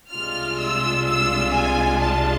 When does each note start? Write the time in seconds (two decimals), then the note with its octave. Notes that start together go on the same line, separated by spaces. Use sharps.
0.10 C2 C3 G#3 D4 F4 F6
0.58 E6
1.05 E6
1.52 G#5
2.00 A5